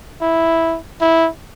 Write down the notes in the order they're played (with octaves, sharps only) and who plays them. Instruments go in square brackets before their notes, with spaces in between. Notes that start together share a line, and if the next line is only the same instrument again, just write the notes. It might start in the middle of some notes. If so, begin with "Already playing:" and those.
[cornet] E4
E4